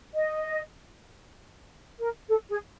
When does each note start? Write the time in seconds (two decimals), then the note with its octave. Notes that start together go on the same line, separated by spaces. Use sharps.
0.14 D#5
1.99 A#4
2.29 A4
2.49 G#4